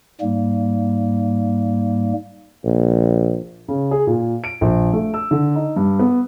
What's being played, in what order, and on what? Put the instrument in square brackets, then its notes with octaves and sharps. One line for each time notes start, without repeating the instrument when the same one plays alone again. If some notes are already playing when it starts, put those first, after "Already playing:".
[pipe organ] G#2 G3 A#3
[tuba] A#1
[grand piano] C#3
G#4
A#2
D7
A#1
A3
E6
D3
D#4
G2
B3